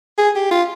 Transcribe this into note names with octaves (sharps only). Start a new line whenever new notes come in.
G#4
G4
F4